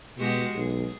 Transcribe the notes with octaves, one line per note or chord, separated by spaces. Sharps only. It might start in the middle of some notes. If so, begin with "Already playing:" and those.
B2 G#3 F#4 G4
B1 G#4